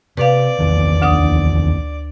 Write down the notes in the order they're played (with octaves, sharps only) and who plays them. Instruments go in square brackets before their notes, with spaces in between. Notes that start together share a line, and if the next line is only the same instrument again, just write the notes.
[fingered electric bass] C3 [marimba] B4 F5 [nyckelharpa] D5
[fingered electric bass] A#1 E2 D#3
[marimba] D2 D4 D#6